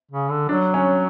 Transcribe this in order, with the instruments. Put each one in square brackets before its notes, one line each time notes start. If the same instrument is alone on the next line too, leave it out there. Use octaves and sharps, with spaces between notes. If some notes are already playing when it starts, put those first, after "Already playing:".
[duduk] C#3
D3
[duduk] F#3 [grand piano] D4
[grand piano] C#4